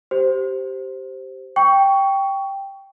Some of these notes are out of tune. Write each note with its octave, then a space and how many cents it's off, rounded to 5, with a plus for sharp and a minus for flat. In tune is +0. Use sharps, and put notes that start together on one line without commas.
G4 -15 C5 +0
G5 +0 C#6 +20